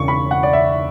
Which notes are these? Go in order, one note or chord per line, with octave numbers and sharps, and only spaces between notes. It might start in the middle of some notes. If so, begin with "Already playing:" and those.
Already playing: E1 C#3 C#6
B5
F#5
D5
E5